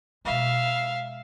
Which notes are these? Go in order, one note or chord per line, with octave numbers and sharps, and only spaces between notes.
B2 G#3 E5 F5